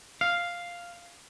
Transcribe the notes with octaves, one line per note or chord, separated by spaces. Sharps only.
F5